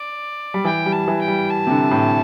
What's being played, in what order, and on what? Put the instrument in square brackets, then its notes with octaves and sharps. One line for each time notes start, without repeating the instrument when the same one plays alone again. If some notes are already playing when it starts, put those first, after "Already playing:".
Already playing: [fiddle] D5
[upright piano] G3
[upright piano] E3 [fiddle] G5
[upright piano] G3
[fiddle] A5
[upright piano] E3
[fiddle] G5
[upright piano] G3
[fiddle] A5
[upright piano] C3
D3
A2